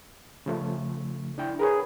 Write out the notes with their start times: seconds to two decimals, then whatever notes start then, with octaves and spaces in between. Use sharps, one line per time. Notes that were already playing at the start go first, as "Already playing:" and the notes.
0.46 C#3 F3 A3
1.38 D4 E4 G5
1.59 G#4 A#4 B4 C#5